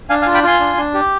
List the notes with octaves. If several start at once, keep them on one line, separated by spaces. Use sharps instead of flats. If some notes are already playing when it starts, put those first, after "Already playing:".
D4 F5 G#5
F5 G#5
F4
G5 B5
F4 G#5 C6
D4
D4
G4